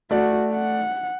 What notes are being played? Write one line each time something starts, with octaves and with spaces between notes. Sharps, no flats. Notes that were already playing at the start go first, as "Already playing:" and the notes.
A3 F#4 D5
F#5